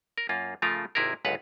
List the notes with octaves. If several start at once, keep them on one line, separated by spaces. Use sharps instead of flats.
A#4
F#2 A#3 F4
C#3 F3 A3 F4 A#4
G#1 C3 E4 G#4 A#4
G1 C#2 F#2 B4 F5 F#5